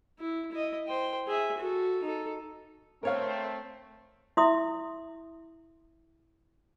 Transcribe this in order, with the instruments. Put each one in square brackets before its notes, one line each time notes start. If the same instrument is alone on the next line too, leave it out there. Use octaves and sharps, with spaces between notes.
[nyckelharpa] E4
E4 D#5
C5 G5
G#4 E5
F#4 A4
D#4 A4
[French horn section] A3 C4 [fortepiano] A#4 C#5 F5
[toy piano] E4 E5 C6 D#6